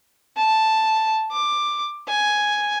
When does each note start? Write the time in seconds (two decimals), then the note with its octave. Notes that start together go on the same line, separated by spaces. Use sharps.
0.37 A5
1.31 D6
2.09 G#5